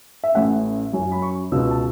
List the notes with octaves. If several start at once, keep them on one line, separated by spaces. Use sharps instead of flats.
E5
A1 A2 A3 C#4 F#5
F#2 F#3 C#4
B5
C#6
C#2 B2 B3 E6
A5